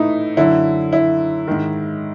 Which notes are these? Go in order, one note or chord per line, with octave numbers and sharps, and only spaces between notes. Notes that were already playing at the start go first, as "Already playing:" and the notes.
Already playing: A2 E3 A3 D#4 E4
F#2 D3 E4
E4
G#2 D#3